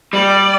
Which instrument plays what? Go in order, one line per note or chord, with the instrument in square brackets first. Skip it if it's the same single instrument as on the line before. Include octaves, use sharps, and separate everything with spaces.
[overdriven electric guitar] G3 [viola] D5